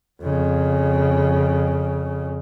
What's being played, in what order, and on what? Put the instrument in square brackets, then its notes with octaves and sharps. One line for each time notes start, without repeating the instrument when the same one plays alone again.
[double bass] F2 C#3